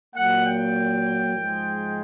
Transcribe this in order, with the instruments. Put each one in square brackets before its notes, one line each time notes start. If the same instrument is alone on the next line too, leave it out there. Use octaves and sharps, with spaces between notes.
[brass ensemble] A#2 F#3 A#3 F#5
G5
G#2 F3 G#3